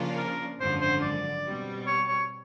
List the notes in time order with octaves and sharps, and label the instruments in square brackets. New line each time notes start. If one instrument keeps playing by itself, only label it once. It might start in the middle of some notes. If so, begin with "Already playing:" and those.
Already playing: [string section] C#3 F3 A#3 D4 F4
[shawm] A#4
[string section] G#1 F#2 D3 F3 [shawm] C5
[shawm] C5
D5
[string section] B2 G3 C4
[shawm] C#5
C#5